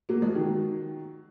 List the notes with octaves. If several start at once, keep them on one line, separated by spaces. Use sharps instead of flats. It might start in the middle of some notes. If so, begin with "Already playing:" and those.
F#3 A#3
F3 G#3
D#3 F#3